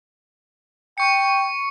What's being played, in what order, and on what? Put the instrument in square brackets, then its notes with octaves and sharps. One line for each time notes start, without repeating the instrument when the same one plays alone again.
[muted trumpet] G5 [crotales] C#6 C#7